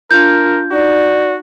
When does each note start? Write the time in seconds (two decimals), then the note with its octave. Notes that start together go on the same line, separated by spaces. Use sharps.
0.11 D4 F4 A#4 G6
0.72 D#4 F#4 D5